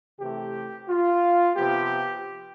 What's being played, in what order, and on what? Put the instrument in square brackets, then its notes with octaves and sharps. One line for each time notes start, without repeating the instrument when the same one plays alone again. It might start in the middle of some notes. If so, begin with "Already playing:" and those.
[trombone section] C3 E3 A3 G4
F4
C3 F3 B3 G4